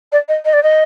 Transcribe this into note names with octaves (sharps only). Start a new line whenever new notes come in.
D5
D#5
D#5
D5
D#5